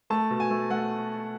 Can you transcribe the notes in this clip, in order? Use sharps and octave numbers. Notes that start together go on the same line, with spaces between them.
A3 A5
B2
G#5
A3
A3 F#5